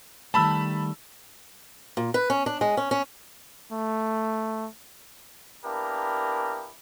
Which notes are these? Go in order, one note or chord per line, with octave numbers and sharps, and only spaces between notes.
D#3 G3 A3 A5 B5 E6
A#2
B4
C#4
D4
G#3
C#4
C#4
A3
A#3 B3 D4 E4 G4 A#4